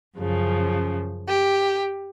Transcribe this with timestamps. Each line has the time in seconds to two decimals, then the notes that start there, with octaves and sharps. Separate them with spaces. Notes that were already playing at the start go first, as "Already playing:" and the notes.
0.17 F#2 C#3 F3
1.28 G4